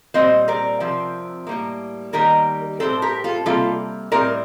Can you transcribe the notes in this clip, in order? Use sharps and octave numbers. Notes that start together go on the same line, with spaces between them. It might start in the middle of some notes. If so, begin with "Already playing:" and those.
A#2 G3 C4 C5 D#5
A#4 D5
C3 F3 C4
A2 G3 A#3
D#3 G3 A#3 G4 A#4
A2 F3 C4 A4 C5
G4 A#4
F4 A4
C3 G3 A#3 F4 A4
A2 G3 C4 A#4 D5